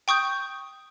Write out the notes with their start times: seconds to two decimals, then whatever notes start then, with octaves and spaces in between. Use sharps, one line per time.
0.08 G5 C#6 D#6 G6